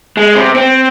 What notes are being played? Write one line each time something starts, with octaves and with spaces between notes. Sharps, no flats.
G#3
C3
C4